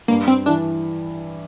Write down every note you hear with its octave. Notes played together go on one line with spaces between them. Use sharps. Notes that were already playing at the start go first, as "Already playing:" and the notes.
G2 A#3
C4
E3 D4